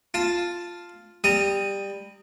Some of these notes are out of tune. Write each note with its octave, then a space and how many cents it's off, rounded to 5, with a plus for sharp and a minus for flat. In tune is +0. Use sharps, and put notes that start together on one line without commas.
F4 +0 A5 +0
G3 +15 A#5 -25 D#6 +0